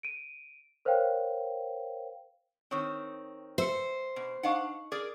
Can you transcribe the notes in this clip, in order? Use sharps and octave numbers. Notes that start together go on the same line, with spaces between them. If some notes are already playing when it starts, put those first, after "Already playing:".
D7 D#7
A#4 C5 C#5 F5 G5
D#3 C4 C#5 C#6 D#6
C5 E5 E6 C#7
B2
D4 D#4 D#5 F5 F#5 C#6
G#4 A#4 D5 D6